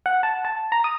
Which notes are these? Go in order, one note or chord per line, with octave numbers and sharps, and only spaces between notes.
F#5
A5
A5
A#5
D#6